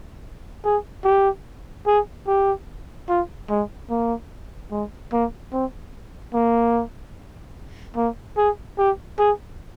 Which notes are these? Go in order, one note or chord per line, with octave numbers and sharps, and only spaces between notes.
G#4
G4
G#4
G4
F4
G#3
A#3
G#3
A#3
C4
A#3
A#3
G#4
G4
G#4